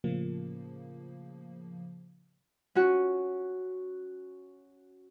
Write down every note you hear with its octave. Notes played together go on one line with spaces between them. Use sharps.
A2 C#3 F3 A#3
C#4 F#4